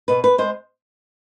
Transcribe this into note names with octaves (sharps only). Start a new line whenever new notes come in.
B2 B4
B4
G#3 C5